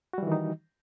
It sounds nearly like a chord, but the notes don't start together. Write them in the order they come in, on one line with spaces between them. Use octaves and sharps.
F#4 G3 E3 D#3 D#4